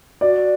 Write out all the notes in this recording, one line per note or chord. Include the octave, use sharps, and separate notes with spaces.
F#4 D5